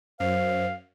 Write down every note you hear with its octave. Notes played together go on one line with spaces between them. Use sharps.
F#2 C5 F5